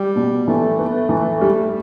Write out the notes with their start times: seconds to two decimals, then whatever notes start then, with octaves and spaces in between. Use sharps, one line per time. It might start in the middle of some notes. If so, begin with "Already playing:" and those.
Already playing: G3
0.16 B2
0.47 E3 A3
0.78 B3
1.09 E3
1.41 G3